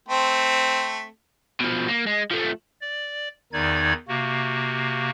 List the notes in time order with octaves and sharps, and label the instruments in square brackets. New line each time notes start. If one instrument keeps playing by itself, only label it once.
[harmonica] A3 C4
[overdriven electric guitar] B2 F3
A#3
G#3
F3 A3
[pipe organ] D5
E2 D#3 D#4 D5 G#6
C3 A#3 F#4